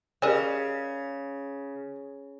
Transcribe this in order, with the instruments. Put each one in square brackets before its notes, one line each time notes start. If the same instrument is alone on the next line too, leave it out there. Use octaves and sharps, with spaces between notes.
[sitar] C#3 [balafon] G4 G#4 A#4 [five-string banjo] D5 [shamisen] D#5 G#5